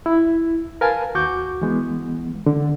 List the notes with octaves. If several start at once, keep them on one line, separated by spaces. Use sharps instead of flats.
E4
A#4 B4 F5 G#5 A5
D#2 F#4 C#6 D6 G6
E3 G#3 B3
D3